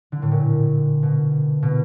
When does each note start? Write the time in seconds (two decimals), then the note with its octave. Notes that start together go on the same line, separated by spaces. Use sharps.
0.12 D3
0.22 A2
0.31 A#2
1.03 B2
1.62 B2